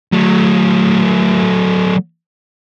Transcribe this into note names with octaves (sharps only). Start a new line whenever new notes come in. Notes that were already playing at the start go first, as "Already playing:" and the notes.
F#3 A3